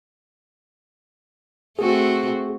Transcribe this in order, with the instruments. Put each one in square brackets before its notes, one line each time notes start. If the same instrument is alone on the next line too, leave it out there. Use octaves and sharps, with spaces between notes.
[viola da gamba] A3 C4 F#4 [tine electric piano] G#4